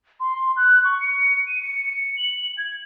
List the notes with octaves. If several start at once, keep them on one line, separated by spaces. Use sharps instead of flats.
C6
F#6
C#6
C#7
D#7
C#7
C#7
F#7
G#6